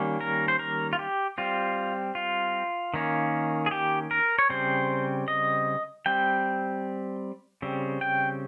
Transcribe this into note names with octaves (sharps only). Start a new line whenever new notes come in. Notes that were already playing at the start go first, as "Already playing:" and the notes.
Already playing: D#3 G3 A#3 C#4
A#4
C5
A#4
F4
G4
G3 C4 F4
F4
D#3 A#3 C#4
G#4
G4
A#4
C#5
C#3 G3 C4 C5
D#5
G3 C4 G5
C#3 G3 C4
G5